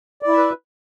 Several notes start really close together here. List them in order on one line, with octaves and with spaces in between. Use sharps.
D5 E4 E5 B4